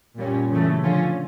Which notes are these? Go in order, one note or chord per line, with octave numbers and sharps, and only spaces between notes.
A#2 G3 C#4
C#3 E3 A3
D3 F3 C#4 F4